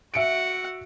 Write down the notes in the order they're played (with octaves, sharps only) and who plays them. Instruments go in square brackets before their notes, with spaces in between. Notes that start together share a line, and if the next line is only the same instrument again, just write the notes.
[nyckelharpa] F#4 F#5 [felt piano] E5 C#7 D7